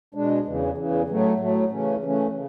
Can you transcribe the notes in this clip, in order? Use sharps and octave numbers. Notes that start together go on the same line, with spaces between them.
B2 G#3 D4
E2 C#3 E3
E2 C#3 E3
A2 F#3 A3
A2 F#3 A3
C#3 E3 A3 C#4
C#3 E3 A3 C#4
C#3